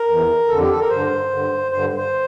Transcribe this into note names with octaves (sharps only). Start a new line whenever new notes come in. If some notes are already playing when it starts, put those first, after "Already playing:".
Already playing: A#4
E2 E3
F2 D3 A4
G4
A4
A#4
G2 D3 C5
G2 D3
G2 D3 C5
C5